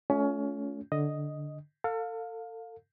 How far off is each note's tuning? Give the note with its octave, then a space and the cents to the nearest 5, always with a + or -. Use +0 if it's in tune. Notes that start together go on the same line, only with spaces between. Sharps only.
A3 -30 C#4 +25 F4 +0
D3 +0 D#5 +0
A4 +35 F5 +20